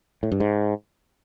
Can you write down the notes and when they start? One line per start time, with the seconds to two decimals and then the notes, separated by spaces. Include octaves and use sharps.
0.23 A2
0.32 G2
0.40 G#2